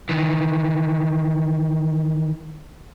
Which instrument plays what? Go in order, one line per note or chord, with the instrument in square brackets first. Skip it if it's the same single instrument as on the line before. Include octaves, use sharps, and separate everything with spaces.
[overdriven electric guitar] D#3 E3